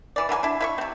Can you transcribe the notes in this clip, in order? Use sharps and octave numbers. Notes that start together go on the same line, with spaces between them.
E3 D5
E3 F#3 A#4 G#5
D4 E4
E4 E5 C#6
C3 C4